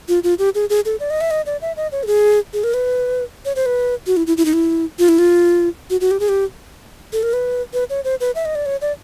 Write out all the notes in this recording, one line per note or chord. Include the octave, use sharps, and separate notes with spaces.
F4
F4
G4
G#4
G#4
A4
D5
D#5
E5
D#5
D5
E5
D#5
C#5
A4
G#4
G#4
A#4
B4
C#5
C5
B4
F#4
E4
E4
E4
D#4
E4
F4
E4
F4
F#4
F#4
G4
G#4
G4
A4
A#4
B4
B4
C#5
C5
B4
E5
D#5
D5
C#5
D5